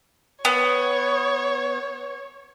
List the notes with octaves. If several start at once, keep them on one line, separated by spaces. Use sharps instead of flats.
B3 C#5